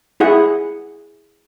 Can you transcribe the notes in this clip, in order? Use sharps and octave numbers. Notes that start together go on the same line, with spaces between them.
E4 G#4 F#5